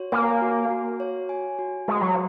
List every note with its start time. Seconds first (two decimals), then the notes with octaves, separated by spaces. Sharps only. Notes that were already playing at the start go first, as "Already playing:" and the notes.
Already playing: F#4 C#5
0.12 A#3 G#5
0.42 F#4
0.70 F#4
1.00 C#5
1.29 G#5
1.59 F#4
1.88 G#3 F#4
2.01 F#3